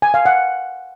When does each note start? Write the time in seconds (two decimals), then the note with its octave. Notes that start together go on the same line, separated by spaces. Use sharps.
0.02 G#5
0.14 F5
0.25 F#5